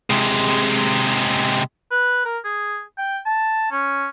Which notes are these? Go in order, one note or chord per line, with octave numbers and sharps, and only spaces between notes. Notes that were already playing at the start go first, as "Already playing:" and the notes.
C3 G#3
B4
A#4
G#4
G5
A5
C#4